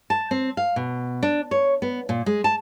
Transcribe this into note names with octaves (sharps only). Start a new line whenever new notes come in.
A5
C4
F5
B2
D4
C#5
B3
A#2
G#3
A5